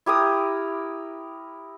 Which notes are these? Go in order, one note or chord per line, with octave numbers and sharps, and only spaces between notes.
E4 G4 A#4 D#6